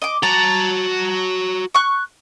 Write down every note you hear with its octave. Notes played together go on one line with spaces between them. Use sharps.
D#5 D6
F#4 A5 A#5
C#6 F#6